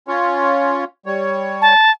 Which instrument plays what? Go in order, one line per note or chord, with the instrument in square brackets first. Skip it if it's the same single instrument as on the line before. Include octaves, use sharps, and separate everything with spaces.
[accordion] C#4 F4 C#5
G3 C#5
[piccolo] A5